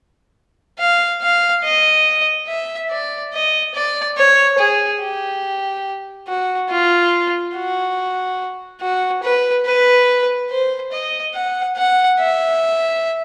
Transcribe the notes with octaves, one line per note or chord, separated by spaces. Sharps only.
F5
F5
D#5
E5
D5
D#5
D5
C#5
G#4
G4
F#4
F4
F#4
F#4
B4
B4
C5
D#5
F#5
F#5
E5